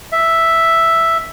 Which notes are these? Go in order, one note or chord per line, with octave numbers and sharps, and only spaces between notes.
E5